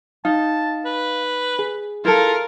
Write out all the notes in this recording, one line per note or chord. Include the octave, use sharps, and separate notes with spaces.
D#4 F5 A5
B4
G#4
E4 F4 A4 A#4 F5